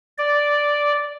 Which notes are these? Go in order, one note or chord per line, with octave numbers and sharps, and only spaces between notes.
D5